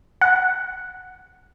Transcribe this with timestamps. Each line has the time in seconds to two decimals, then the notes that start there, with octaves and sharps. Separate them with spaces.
0.21 F#5